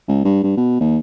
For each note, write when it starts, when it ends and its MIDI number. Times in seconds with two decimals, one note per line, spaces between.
0.08 0.21 37
0.24 0.41 43
0.43 0.52 43
0.57 0.79 47
0.80 0.97 39